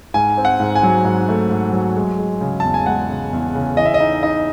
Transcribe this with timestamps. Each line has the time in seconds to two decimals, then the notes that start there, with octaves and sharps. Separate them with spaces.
0.14 G#2 G#5
0.37 C4
0.45 F#5
0.60 G#2
0.75 G#5
0.83 F#3
1.05 G#2
1.29 A3
1.51 G#2
1.73 F#3
1.96 G#3
2.18 G#3
2.41 C#3
2.60 E2 A5
2.74 G#5
2.86 G#3 F#5
3.09 C#3
3.33 E2
3.55 C#3
3.77 E3 D#5
3.85 E5
3.94 D#5
4.00 D#4
4.23 D#4 D#5